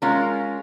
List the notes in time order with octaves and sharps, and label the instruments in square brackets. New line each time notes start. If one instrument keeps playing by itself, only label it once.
[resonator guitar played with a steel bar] G#3 C#4 F4 A#4